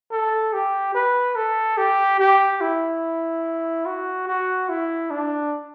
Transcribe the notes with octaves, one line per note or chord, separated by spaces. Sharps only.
A4
G4
B4
A4
G4
G4
E4
F#4
F#4
E4
D4